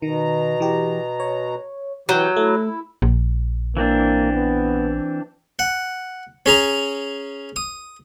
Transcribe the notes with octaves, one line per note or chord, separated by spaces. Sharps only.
B2 D#3 A#5
E3 G4
C#5
E3 F#3 G4 F#5 G6
A3 E4
A#1
E3 A#3 C4 D4
B3
F#5
C#4 G#4 A#5
D#6